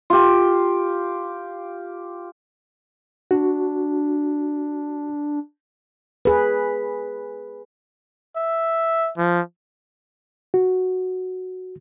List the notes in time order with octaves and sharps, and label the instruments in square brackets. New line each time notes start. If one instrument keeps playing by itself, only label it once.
[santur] F4 G4
[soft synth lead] D4 [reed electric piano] F#4
[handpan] G#4 B4
[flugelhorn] E5
F3
[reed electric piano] F#4